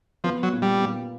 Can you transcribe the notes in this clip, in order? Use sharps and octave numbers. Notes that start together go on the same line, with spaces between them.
F3 B3
F#3
A#2
G3
A#2